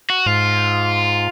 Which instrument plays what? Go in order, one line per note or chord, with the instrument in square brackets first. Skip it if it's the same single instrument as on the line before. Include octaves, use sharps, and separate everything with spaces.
[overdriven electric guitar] F#4
[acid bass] G#2 [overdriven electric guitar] F4